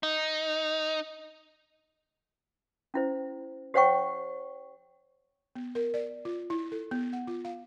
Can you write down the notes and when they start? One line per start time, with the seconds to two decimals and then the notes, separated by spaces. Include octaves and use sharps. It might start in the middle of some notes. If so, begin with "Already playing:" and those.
0.03 D#4
2.94 C#4 E4 C5
3.74 G4 C5 C#5 F#5 G5 C#6
5.55 B3
5.75 A#4
5.94 D5
6.25 F4
6.50 E4
6.72 A4
6.91 B3
7.13 F#5
7.27 F4
7.45 F5